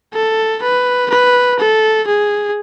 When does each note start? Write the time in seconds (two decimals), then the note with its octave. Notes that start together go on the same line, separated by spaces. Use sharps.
0.14 A4
0.63 B4
1.10 B4
1.60 A4
2.07 G#4